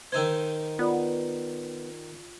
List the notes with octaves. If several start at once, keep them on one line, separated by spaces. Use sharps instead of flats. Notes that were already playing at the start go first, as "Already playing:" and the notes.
D#3 D#4 C5 E6 G#6
B3 F4 D5